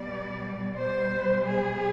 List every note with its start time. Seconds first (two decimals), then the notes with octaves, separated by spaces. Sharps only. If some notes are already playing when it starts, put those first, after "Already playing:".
Already playing: B2 G3 D5
0.77 B2 G3 C5
1.45 G#4